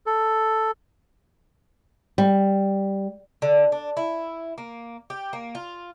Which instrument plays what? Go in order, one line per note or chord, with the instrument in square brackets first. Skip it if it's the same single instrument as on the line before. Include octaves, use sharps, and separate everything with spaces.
[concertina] A4
[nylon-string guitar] G3
[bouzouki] D3
D4
E4
A#3
G4
A#3
F4